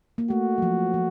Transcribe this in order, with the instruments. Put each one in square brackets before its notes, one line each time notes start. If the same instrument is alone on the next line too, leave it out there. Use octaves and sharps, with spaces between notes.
[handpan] A#3
[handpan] A3 [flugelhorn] F#4
[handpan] F#3
F3
F3